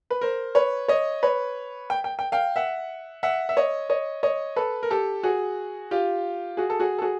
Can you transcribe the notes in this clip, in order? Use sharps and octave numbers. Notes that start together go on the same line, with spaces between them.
B4
A#4 C5
B4 C#5
C#5 D#5
B4 C#5
G5
G5
G5
F5 G5
E5 F#5
E5 F#5
E5
C#5 D#5
C#5 D#5
C#5 D#5
A4 B4
A#4
G4 A4
F#4 G#4
F4 G4
F#4 G#4
A4
F#4 G#4
A4
F#4 G#4